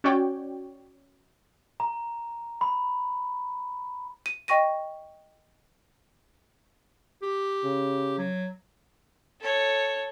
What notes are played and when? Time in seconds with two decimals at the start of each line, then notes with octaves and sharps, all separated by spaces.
0.04 C#4 F#4 C#5 D5 G5
1.80 A#5
2.61 B5
4.26 D#7
4.48 D#5 G5 C#6 A#6 D#7
7.22 G4
7.64 C#3
8.18 F#3
9.41 A4 C#5